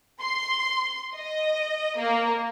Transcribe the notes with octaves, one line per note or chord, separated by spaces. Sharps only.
C6
D#5
A#3